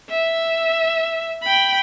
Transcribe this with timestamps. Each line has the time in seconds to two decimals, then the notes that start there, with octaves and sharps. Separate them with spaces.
0.10 E5
1.42 G5 B5